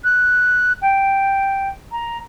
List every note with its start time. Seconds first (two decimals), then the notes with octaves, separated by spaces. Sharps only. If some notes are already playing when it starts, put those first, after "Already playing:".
0.04 F#6
0.82 G5
1.92 A#5